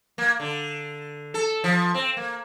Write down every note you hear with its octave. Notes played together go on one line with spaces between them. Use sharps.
A#3
D3
A4
F3
C4
A#3